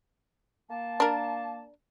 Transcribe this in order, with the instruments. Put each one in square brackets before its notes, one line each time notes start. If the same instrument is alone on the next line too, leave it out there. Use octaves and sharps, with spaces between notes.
[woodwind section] A#3 A5
[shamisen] D4 A#4